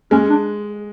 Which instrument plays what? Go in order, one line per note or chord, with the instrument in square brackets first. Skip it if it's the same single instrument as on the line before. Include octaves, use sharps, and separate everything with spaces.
[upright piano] G#3 [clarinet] C#4
[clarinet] D4